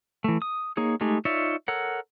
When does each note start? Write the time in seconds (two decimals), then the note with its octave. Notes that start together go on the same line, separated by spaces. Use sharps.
0.24 E3 A3
0.42 D#6
0.77 A#3 D#4 G#4 C#5
1.01 G#3 A3 D#4 G4 G#4
1.25 D#4 F4 C#5 D5 E5
1.68 A4 A#4 C#5 F#5